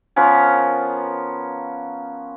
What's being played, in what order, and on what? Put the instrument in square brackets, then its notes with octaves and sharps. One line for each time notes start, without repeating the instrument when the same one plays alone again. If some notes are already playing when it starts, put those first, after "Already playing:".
[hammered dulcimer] F3 B3 C#4 A#4